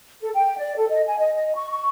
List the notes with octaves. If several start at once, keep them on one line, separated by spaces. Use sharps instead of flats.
A4
G5
D5
A4
D#5
G#5
D#5
D#5
C#6
C#6